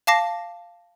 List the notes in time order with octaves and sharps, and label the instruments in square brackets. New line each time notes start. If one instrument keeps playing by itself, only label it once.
[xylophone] F5 A5 D6 A#6 C7